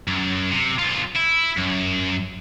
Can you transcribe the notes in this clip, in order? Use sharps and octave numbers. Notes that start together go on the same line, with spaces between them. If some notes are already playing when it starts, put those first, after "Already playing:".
F#2
C3
B1 F4
E4
F#2